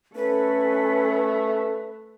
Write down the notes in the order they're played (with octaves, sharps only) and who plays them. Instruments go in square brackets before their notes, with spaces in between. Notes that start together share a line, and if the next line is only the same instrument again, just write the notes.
[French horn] A3 [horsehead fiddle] C#4 A4 [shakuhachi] B4